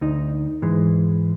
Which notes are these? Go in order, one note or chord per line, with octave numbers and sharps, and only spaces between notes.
D2 D#4
G#2 E3 G#3